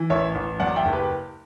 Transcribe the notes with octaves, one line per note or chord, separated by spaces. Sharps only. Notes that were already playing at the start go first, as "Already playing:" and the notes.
Already playing: E3
A1 C#5 E5
A1
F#2 D5 F#5
E5 G5
F#1
G4 B4